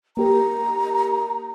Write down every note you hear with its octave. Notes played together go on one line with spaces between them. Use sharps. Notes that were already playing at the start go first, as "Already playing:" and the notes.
A#3 G4 A#4 A#5